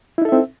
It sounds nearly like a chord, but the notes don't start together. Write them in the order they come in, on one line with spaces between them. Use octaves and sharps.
E4 D#4 A4 E5 C4